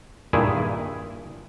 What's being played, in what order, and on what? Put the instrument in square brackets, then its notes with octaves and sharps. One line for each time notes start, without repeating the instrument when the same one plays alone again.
[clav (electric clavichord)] G2 A#2 D#3 E4 G#4